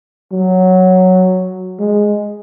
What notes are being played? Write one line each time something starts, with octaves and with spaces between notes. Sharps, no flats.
F#3
G#3